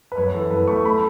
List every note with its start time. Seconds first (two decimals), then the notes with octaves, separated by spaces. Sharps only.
0.12 B4
0.17 F#2 C#5
0.34 E3 A4
0.51 F#2 B4
0.68 A3 C#6
0.85 A3 B5